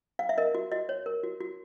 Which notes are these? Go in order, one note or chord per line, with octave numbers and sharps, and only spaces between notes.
F5
E5
A#4 D#5
F#4
F#4 D#5
C#5
A#4
F#4
F#4